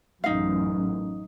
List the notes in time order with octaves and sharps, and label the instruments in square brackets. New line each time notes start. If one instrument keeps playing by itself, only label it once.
[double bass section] A1 F#2 [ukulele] D#4 F5